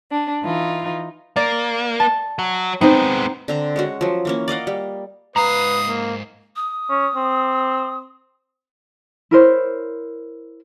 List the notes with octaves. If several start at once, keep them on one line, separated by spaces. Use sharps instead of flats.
D4
E3 D#4 F4
A#3 D5
A5
F#3
G#3 B3 C4 D#4 C5
D3 C4 A#5
G#3 C#4 F#4
F3 F#3
E3 A#3 C#4
D5 D#5 F5 F#5
G3
G#2 B4 F5 A#5 D#6
A#3
D#6
C#4
C4
E4 A#4 C5 C#5